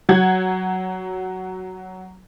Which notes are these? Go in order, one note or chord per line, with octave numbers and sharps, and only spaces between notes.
F#3 F#5 G#6